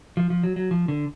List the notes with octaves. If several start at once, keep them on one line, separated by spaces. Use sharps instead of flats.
F3
F3
F#3
F#3
F3
D3